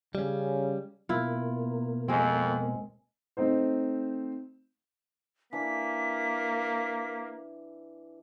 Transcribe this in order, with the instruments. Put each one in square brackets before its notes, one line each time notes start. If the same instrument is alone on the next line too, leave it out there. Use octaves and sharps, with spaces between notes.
[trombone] C#3 [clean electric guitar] G3 C#4
[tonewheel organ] B2 A#3 [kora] E4 F4
[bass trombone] F2 [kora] G#3 C4
[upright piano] A3 C4 D#4 C5
[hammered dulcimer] E3 D4 E4 [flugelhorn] A#3 [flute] B6